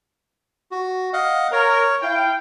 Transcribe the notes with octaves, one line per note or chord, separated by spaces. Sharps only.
F#4
D#5 F5 F#5
A#4 C#5
E4 F5 G5